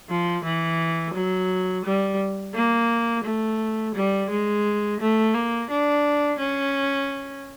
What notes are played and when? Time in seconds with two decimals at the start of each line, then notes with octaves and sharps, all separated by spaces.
0.09 F3
0.44 E3
1.14 F#3
1.85 G3
2.54 A#3
3.24 A3
3.95 G3
4.30 G#3
5.00 A3
5.34 A#3
5.70 D4
6.39 C#4